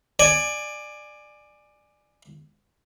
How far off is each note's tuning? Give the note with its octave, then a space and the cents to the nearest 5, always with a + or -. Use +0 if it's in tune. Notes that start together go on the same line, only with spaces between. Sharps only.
D5 +20 G#5 +0